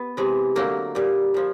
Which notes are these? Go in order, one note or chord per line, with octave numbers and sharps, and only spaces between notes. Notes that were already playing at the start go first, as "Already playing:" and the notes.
Already playing: B3
C3 E3 G#3
D3 F#3 A3 A#3
A#2 G3
A#2 F3